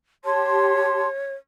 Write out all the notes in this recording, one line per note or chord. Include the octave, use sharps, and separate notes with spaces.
G4 C#5 A5 C6